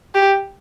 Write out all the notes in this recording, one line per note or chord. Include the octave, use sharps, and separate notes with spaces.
G4